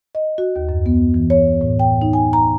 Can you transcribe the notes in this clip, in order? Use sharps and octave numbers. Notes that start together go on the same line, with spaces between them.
D#5
F#4
D#2
F#2
B3
E3
C#5
A2
G5
D#4
G#5
A#5